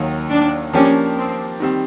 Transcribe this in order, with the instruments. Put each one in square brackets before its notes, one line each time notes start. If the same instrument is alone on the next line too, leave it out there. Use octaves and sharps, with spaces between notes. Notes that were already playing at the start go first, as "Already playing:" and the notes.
Already playing: [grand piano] D#2 D#3 F#3
[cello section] D4
[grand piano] F3 A#3 D4 G4 [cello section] C#4
[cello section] C4
[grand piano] D#3 G3 C4